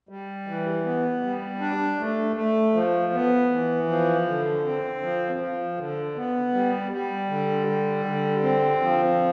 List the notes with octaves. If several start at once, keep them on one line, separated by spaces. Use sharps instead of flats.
G3
E3
B3
G3
D4
A3
A3
F3
B3
E3
F3
D3
C4
F3
F3
D3
B3
G3
G3
D3
G3
D3
C4
F3